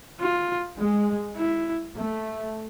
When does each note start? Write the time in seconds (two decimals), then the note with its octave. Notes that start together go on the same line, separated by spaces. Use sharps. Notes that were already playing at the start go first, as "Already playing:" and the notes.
0.20 F4
0.78 G#3
1.37 E4
1.95 A3